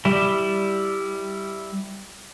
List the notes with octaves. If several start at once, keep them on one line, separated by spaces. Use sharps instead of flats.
G3 E4